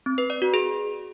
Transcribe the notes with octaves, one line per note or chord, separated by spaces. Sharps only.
C4
B4
D5
F#4
G#4